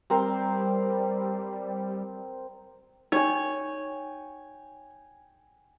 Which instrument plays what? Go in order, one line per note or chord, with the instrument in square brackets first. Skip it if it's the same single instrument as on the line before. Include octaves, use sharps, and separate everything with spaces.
[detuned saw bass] G3 [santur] C4 A#4 C5
[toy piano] D#4 [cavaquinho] C#5 [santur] G5 G#5